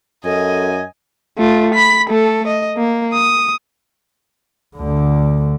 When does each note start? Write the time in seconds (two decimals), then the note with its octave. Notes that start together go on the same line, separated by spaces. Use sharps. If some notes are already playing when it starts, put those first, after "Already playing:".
0.25 F#2 A4 D#5 G#5
1.38 A3 F4
1.75 B5 B6
2.10 A3 A4
2.48 D#5
2.77 A#3
3.13 D#6
4.76 D2 D3